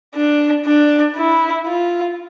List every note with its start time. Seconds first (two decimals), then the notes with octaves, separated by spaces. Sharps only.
0.15 D4
0.66 D4
1.17 E4
1.67 F4